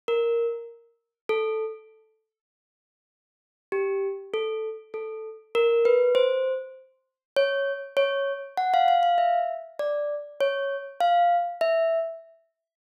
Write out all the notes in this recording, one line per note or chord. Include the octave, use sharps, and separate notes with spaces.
A#4
A4
G4
A4
A4
A#4
B4
C5
C#5
C#5
F#5
F5
F5
F5
E5
D5
C#5
F5
E5